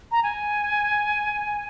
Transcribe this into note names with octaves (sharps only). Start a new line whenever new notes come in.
A#5
G#5